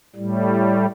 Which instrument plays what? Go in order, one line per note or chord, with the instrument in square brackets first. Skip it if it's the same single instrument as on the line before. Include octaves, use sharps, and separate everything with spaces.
[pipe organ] A2 G3